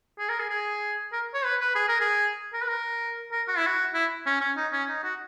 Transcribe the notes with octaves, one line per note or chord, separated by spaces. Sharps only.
G#4
A#4
G#4
G#4
A#4
C#5
B4
B4
G#4
A#4
G#4
A#4
B4
A#4
A#4
F#4
E4
F#4
E4
C#4
C#4
D#4
C#4
D#4
F#4